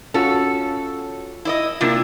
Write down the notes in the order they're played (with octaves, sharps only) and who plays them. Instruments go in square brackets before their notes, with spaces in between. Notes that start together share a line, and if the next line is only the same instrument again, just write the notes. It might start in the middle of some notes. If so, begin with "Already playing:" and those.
[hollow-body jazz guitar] C#4 F4 F#4 [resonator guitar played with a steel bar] A4
[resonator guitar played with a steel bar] E4 D5 D#5
[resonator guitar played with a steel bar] C3 D4 E4 [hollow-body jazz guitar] A#3 F4